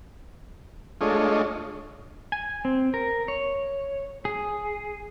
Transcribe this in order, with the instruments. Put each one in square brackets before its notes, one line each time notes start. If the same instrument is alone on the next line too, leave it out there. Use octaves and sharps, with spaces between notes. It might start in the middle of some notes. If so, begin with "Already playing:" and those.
[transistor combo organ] G#3 A3 D4 F4 C#5 D#5
[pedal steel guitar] G#5
C4
A#4
C#5
G#4